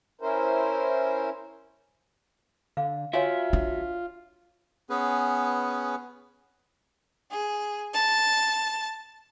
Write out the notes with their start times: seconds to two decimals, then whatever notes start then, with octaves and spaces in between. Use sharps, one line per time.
0.21 C#4 E4 A#4 C5
2.77 D3 F5
3.13 F4 F#4 C#5 E5 F5 G#5
3.53 D4
4.90 B3 C#4 G#4 B4
7.30 G#4
7.93 A5